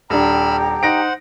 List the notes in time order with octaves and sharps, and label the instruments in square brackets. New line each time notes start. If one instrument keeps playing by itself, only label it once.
[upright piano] D#1 D4 [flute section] G4 G5 A#5 [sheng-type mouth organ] B5 E6 F6
[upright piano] D#4 A#6 D7 [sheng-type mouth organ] C5 F#5